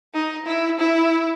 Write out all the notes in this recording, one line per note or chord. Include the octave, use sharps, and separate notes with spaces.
D#4
E4
E4